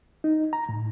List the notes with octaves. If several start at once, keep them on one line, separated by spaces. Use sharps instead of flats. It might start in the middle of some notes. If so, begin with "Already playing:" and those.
D#4
A#5
A2